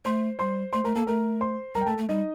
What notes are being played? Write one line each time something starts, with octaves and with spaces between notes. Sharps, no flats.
A3 C5 C6
G3 C5 C6
A3 C5 C6
A3 A#4 A#5
A#3 A4 A5
A3 A#4 A#5
C5 C6
G3 A#4 A#5
G5
A3 A4 A5
A3
G3 D#4 D#5